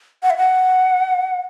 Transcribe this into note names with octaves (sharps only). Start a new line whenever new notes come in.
F#5
E5
F#5